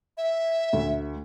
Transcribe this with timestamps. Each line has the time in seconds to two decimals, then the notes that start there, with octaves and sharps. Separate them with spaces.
0.17 E5
0.73 D2